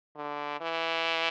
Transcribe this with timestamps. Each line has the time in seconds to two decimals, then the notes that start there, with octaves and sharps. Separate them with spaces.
0.17 D3
0.61 E3